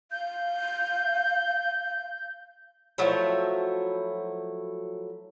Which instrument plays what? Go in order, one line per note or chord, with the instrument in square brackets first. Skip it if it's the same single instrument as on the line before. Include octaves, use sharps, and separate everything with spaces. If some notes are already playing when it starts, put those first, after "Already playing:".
[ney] F5 [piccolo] G6
[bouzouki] F3 F#3 A3 E4